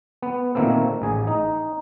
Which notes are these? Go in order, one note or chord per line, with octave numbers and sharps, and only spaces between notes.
B3
A#2 D#3 A3 A#3 C4
A1 G#4 G#5
D#4